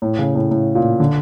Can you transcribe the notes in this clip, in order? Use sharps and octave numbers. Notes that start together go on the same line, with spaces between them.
A2
C#3
A2
A2
A#2
D3